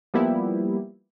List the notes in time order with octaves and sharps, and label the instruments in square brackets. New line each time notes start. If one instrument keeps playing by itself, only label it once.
[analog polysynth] F3 G3 A#3 B3 E4 G4